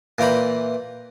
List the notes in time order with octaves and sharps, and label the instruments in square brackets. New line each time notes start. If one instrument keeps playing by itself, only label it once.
[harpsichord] A#2 E3 G5 A#5 B5